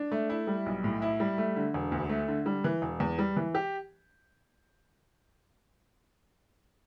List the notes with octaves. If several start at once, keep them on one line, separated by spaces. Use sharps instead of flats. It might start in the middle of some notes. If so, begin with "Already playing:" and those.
Already playing: D4
A3
E4
G3
B1
A2
E4
G3
A3
D3
E1
D2
A3
D3
G3
E3
E1
E2
G3
E3
G4